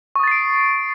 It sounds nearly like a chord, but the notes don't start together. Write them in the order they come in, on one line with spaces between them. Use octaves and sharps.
C#6 D#6 A6 C7 D7